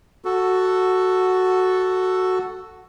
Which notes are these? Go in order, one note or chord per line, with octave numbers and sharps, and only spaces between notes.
F#4 A4